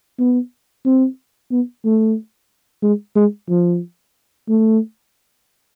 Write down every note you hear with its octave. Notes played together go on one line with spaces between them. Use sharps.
B3
C4
B3
A3
G#3
G#3
F3
A3